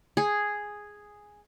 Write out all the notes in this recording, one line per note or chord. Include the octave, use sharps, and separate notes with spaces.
G#4